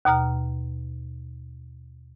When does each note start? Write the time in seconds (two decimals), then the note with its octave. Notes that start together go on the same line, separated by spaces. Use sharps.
0.05 D#2 B2 A#5 F6